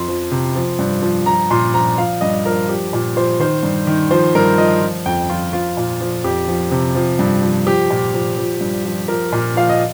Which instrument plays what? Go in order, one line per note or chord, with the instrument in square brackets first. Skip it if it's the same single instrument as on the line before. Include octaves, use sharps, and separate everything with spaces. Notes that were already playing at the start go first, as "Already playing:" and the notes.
Already playing: [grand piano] F2 C6
F3
C3
F3
G2
F3
F3 A#5
A#2 C6
F3 A#5
F3 F5
G2 D#5
F3 A#4
F3 G4
A#2
F3 C5
D#3 C5
G2
D#3
F3 C5
G2 A#4
F3 D#5
F3
F2 G5
F3 F4
F3 F4
A#2
F3
F2 G4
F3
C3
F3
G2
F3
F3 G4
A#2
F3
F3
G2
F3
F3 A#4
A#2
F3 F5
D#5